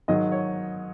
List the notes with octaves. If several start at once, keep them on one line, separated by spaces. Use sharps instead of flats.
G#2 D#3 F#3 D#5
C#5